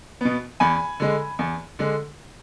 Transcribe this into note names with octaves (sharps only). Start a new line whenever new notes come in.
B2 B3
E2 G#5 B5
D3 G#3
E2
D3 G#3